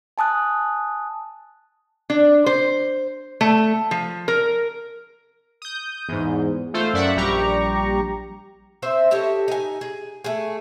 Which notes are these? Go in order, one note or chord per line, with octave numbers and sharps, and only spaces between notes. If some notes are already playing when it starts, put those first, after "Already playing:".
G#5 A5 D#6 F#6
D4
C5
A3
F3
A#4
D#6 G6
E2 G#2
A3 F4 A4 C5
F#2 D5 E5 F#5
A#1 G3 G4 A#5 C#6
C4 C5 E5
G4 A4 C#5 D#5
D#4 G#5
G#4
A3 G#4